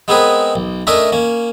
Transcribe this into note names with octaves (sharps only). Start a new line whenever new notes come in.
G#3 B3 C4 G#4 A#4 B4
B1
A3 C#4 D4 A#4 D#5 E5
A#3 C#4